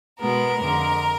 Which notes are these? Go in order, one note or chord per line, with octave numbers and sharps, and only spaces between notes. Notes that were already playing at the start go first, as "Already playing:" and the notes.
B2 G#3 B3 A#4
F2 D3 G#3